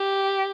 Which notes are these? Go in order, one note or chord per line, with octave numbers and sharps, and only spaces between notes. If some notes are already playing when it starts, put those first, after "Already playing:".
Already playing: G4